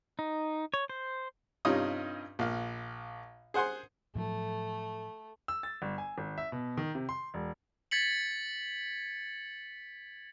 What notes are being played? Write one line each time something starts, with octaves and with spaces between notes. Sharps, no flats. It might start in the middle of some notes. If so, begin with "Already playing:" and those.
D#4
C#5
C5
G2 C3 C#4 D#4 F4 D#6
A#1 F5
G#4 C5 F#5 G#5 C6
A2 F3 F#3 A3
E6
A6
G1
G#5
G#1
E5
B2
D#3
C3
C6
E1
G#6 A6 B6 C#7 F#7